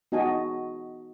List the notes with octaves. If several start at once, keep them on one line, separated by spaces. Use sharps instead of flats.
B3 D#4 F#4 D#5 G#5 A5